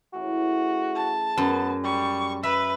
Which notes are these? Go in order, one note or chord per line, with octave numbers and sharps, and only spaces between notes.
A2 C#3 E3 F#4
A5
F#2 B3
G3 C#6
B4 E5